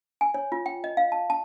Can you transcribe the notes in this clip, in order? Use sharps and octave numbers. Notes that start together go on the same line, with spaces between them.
G#5
C#5
F4
G5
D#5
F5
A5
A5